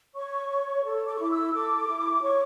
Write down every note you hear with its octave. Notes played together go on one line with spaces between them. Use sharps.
C#5 C#6
C#5
A4
D6
C#6
E4 D6
E6
A4 D6
E4
C#5 C#6